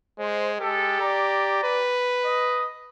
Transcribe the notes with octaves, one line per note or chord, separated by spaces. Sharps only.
G#3 C5
G#3 G4 A4
D5 A#5
B4
D#5